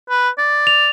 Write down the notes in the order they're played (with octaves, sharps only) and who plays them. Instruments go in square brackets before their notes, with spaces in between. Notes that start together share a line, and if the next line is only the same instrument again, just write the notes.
[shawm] B4
D5
[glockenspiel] F7